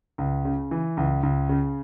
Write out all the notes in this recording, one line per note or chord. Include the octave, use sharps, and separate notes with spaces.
C#2
C#3
E3
C#2
C#2
C#3